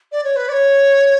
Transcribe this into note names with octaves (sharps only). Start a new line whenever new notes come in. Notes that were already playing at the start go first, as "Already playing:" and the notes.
D5
C#5
B4
D5
C#5